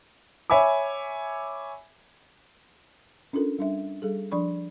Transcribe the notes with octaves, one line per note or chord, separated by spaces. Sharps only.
C#5 E5 G#5 B5 D6
C#4 D4 F4 A4 A#4
G3 D4 E5
G3 G#4 A4
F3 D4 D5 B5 C#6